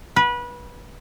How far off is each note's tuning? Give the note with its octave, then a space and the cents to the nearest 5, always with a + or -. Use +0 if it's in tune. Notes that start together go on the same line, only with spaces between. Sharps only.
B4 -25